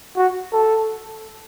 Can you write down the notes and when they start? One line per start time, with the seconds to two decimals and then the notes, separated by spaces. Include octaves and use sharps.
0.17 F#4
0.53 A4